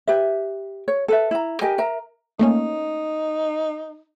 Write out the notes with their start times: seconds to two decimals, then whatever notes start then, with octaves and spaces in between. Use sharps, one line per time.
0.07 G4 B4 E5
0.88 C#5
1.08 A4 B4 E5
1.31 E4 A#5
1.61 G4 A#4 D#5 G#5
1.78 A#4 E5 A#5
2.39 A3 A#3 C#4 D#4